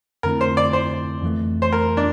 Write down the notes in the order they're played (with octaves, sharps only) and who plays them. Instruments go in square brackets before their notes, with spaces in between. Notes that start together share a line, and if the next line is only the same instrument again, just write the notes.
[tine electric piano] F2 D3 A3 C4 E4 [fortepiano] A#4
[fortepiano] C5
D5
C5
[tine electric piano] F2 E3 A3
[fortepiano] C5
A#4
D4